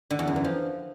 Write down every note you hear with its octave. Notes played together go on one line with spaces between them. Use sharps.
D3
E2
F#2
E3
F3